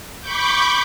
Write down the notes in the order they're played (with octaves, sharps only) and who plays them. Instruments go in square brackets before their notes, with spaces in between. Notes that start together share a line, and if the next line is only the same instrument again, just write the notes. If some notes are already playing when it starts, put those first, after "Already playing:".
[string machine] B5 C#6 D6 G6